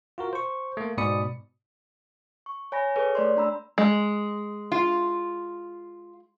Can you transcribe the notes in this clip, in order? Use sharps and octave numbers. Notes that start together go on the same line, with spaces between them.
F4 F#4 A#4
C5 C#6
A3 A#3
G#2 B2 D5 B5 D#6 C#7
C#6
C#5 G#5 B5 A#6
G#4 A4 B4 C#5
A3 D5 C6
A3 D4 A#5 B5 E6
G#3
F4